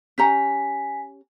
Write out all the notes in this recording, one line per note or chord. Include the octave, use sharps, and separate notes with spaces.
C#4 G4 G#5 A#5 B6